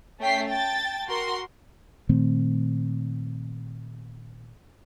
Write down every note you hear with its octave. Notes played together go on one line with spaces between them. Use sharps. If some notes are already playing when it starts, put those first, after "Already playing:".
A3 C#4 G5 B6 C7
G5 A5 A6
F#4 A#4 C6
A#2 D#3 A3 C4